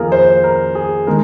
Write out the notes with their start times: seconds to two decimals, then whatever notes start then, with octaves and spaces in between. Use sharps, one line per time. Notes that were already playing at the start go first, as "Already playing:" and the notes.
Already playing: F2 D#3 A#3 F4 G#4 A#4
0.12 C5
0.44 A#4
0.75 G#4
1.07 D#3 G#3 A#4